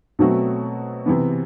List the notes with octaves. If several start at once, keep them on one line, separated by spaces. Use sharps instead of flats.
B2 F#3 A3 C4 F#4
C3 E3 B3